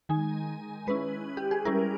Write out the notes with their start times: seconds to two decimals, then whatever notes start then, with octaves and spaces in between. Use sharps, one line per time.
0.09 D#3 G#3 D#4 G#5
0.87 G#3 C#4 E4 B4
1.37 G4
1.51 G#4
1.65 G3 C#4 E4 A#4